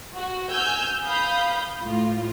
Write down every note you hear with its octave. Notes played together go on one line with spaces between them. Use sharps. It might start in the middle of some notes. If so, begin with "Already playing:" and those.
F#4
G#5 E6 F6 G6
F5 B5 D#6 G6
A2 F4